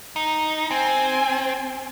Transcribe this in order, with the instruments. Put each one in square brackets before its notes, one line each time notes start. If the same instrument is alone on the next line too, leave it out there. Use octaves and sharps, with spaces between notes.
[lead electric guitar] D#4
[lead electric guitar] C4 [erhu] G#5